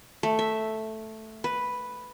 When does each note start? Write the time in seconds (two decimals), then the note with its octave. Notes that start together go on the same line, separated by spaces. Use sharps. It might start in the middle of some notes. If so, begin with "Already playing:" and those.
0.23 A3
0.39 E5
1.44 B4